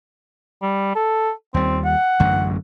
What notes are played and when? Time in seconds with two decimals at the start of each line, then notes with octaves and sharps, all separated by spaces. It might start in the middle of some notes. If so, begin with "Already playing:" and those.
0.62 G3
0.96 A4
1.54 D#2 G3 C4
1.85 F#5
2.20 A1 F#2 D3